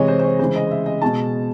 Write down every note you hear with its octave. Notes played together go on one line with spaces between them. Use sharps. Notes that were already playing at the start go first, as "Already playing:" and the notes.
Already playing: C3 E3 G#3 C#5 D#5
C5
C5
C#5
C#3 E3 G#3 C5
D#5
E5
D#5
B2 G#3 A5